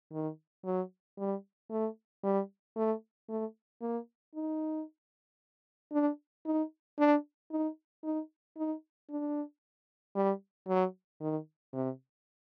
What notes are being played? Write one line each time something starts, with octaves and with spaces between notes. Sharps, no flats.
D#3
F#3
G3
A3
G3
A3
A3
A#3
D#4
D4
D#4
D4
D#4
D#4
D#4
D4
G3
F#3
D#3
C3